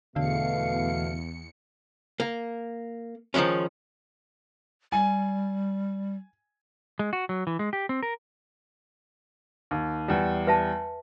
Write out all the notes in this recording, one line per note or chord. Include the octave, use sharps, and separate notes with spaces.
E2 B2 D3 A3 F5 C#7
A#3
D#3 F3 G3 G#3 C#4
G3 G#5
G#3
F#4
F#3
E3
G#3
G4
C4
A#4
D#2
E2 G3
B4 E5 A5